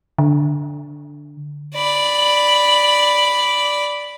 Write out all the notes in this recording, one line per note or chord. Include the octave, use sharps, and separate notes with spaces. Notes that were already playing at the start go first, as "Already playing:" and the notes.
D3
D5 B5